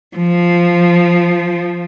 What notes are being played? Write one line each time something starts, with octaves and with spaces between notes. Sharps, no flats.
F3